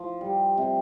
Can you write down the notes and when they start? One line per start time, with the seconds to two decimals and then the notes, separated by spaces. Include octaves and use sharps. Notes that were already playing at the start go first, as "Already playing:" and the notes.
Already playing: F3
0.21 G3
0.58 C3